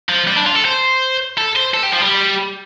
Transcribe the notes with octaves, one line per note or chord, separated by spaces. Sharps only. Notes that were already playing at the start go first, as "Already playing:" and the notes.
F3
G3
D4
F4
A4
C5
A4
C5
A4
G4
F3
G3